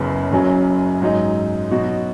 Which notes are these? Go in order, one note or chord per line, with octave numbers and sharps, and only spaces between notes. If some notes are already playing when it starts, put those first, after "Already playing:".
Already playing: F#1 F#2 C#3 B3
F#1 F#2 F#3 C#4
G#2 F#3 D#4
B2 F#3 D#4 F#4